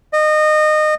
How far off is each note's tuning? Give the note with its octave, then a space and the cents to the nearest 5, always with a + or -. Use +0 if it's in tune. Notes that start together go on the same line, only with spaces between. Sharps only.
D#5 -25